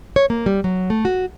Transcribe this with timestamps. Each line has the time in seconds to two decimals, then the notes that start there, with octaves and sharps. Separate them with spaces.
0.16 C#5
0.30 A#3
0.46 G3
0.64 F#3
0.90 A3
1.05 F#4